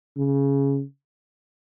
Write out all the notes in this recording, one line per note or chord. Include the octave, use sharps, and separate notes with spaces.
C#3